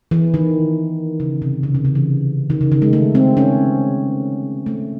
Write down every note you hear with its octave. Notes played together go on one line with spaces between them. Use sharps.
E3
D#3
C#3
C3
C#3
C3
C#3
E3
D#3
C#3
D#3
G#3
A3
C4
C#4
A3